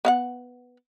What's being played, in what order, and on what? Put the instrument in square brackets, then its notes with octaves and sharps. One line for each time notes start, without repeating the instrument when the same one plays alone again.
[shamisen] B3 F5 F#5